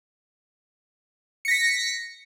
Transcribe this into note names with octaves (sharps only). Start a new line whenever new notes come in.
A#6 B6 C#7